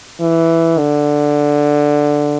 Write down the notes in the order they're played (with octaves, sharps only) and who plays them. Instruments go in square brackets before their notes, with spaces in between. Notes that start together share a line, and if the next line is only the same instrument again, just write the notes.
[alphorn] E3
D3